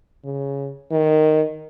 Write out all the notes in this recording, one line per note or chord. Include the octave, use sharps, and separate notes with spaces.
C#3
D#3